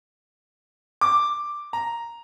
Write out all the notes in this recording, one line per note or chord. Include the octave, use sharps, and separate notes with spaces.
D6
A#5